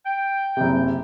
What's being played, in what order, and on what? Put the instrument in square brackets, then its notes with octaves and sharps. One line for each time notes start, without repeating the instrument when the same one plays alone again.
[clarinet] G5
[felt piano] F#1 C3